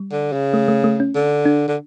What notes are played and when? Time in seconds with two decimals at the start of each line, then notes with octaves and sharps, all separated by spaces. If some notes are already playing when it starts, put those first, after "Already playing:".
Already playing: G3
0.12 D3
0.32 C#3
0.54 A3
0.68 A3
0.84 A3
1.00 C#4
1.15 D3
1.45 D4
1.68 D3